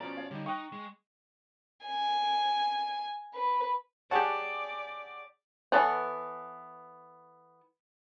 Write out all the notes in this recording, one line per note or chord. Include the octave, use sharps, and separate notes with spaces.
B2 F3 C#4 D5 A#5
C#5 F5
D3 G3 D#4
D#4 G5 C#6 D#6 F#6
G#3
G#5
B4
G4 G#4 C#5 D5 F#5 A5
E3 B3 A4 C#5 F#5